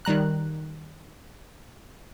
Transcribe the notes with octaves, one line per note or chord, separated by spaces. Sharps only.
D#3 G3 A#5 F#6